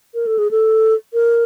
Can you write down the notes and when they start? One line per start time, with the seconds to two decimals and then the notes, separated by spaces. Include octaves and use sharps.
0.14 A#4
0.26 A4
0.38 G#4
0.51 A4
1.13 A#4